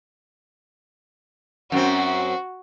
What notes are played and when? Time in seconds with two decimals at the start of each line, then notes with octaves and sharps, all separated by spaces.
1.72 F#2 C4 F#4